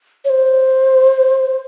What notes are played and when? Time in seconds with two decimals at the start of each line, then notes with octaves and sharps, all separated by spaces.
0.25 C#5
0.30 C5